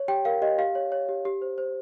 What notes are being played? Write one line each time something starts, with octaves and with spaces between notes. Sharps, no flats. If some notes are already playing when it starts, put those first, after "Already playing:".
Already playing: C#5
G4 G5
A#4 F5
G4 D#5
G4 F5
C#5
C#5
G4
G4
C5
C5